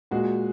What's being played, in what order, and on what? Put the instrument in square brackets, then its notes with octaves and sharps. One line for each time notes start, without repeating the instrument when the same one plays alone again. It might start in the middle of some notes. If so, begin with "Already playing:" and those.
[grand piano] A#2 G#3 F#4